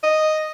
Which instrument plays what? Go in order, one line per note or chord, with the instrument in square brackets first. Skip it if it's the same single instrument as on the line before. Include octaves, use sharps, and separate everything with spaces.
[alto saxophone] D#5